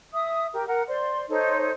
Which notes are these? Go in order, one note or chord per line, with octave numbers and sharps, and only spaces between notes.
E5 D#6
G4 A#4
A#4 F#5
C5 D5 C6
D#4 A4 C5 C#5